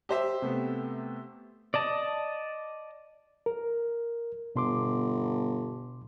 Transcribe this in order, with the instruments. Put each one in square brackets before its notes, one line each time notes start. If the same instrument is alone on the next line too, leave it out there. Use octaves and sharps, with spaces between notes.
[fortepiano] G4 C5 E5
[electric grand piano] C3 A3 B3
[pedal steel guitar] D5 D#5 A5
[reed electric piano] A#4
[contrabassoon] G1 [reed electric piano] B2 C6 D6